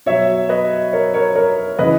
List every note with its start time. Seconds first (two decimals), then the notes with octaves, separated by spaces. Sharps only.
0.06 B2 F#3 C#5 E5
0.49 B4 D#5
0.93 A#4 C#5
1.14 A#4 C#5
1.35 A#4 C#5
1.79 C#3 E3 B4 D#5